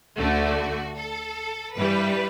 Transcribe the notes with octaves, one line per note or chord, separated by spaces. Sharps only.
D2 D3 A3 F#4
A4
G2 E3 G3 B4